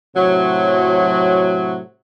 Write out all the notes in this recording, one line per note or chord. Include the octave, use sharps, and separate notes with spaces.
A2 C3 F#3